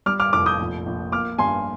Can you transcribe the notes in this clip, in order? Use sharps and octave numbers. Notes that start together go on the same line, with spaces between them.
G3 D6 F6
D6 F6
F1 D6 F6
D#6 G6
A#1
A#1
A#3 D6 F6
G2 G#5 C6